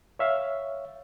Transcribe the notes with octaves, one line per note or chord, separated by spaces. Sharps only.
C#5 E5 F5